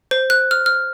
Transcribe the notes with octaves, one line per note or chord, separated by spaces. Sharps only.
C5
F#6
F6
F6